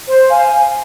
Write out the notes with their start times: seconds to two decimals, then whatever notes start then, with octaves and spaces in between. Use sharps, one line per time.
0.06 C5
0.29 F5 G#5